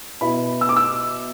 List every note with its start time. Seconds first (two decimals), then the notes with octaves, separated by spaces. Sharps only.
0.21 B2 B3 E4 B5
0.61 E6
0.69 D6
0.76 E6